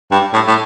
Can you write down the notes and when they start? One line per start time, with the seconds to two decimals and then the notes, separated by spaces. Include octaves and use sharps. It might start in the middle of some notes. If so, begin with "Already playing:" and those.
0.11 G2
0.33 A2
0.47 A2